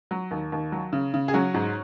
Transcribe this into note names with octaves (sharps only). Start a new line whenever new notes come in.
F#3
D#2
D#2
F#3
C#3
C#3
G#4
F#3 C#4 F#4
G#2